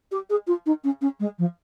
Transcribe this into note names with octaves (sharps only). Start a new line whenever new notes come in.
G4
G#4
F4
D#4
C#4
C#4
G#3
F3